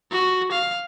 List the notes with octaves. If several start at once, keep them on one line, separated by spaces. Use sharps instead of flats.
F#4
F5